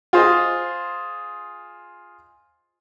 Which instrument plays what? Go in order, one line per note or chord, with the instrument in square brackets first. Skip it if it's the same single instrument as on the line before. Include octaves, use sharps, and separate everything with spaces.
[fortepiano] F4 G#4 C5 D#5